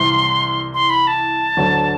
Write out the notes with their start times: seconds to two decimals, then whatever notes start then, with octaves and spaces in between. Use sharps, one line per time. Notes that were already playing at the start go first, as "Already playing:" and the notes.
Already playing: C2 C3 E3 E4 C6
0.74 C6
0.90 B5
1.07 A5
1.57 D2 D3 F#3